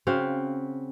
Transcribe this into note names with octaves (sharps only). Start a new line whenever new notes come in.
C#3 C4 F#4 F5